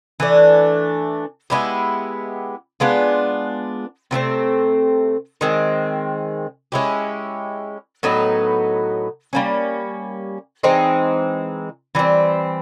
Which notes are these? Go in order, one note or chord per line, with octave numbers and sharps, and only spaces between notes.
E3 A3 D4
G#3 B3 E4 G4
G#3 B3 D4 F4
C3 F3 A3 C4
D#3 G#3 C4
G#3 C#4 E4 G4
A2 F#3 B3 D#4
G3 A#3 C#4
E3 G#3 C4 D#4
E3 G3 C4